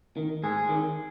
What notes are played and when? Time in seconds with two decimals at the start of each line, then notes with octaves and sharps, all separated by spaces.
0.17 D#3
0.43 G#2 G#4
0.69 D#3